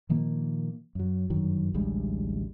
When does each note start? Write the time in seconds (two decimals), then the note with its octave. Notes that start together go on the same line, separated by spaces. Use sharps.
0.09 A#2 D#3 F3 A#3
0.95 F#2 F#3
1.30 G1 F#2 D#3 F#3
1.74 A1 D2 G3 G#3